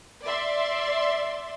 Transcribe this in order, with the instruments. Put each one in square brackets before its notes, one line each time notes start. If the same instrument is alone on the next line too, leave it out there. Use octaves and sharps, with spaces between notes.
[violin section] D5 E5 C6